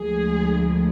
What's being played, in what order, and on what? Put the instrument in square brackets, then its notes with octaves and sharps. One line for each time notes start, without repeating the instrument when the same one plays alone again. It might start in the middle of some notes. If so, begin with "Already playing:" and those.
Already playing: [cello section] D2 D3 F3 G#3 G#4